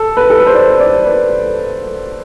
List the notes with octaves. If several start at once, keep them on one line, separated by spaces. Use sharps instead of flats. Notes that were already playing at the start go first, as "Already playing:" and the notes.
Already playing: A4
B4
A4
B4
C5
D5
D5
B4